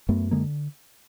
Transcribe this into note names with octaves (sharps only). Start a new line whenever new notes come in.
F#2 A3 B3
D3 G#3 A#3